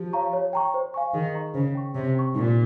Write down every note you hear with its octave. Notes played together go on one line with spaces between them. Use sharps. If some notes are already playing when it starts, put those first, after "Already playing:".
Already playing: F3 G4
C#5 F5 A#5 C#6
C#5
G5 A#5 C#6
C5
F5 G#5 C#6
D#3 G#4
D#5 A#5 C#6
C#3 C5
G5 C#6
C3 C#5
G5 C#6
A#2 D#4